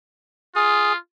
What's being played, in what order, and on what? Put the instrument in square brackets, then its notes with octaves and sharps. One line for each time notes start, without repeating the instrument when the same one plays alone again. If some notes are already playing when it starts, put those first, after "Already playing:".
[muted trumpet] F4 [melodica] G#4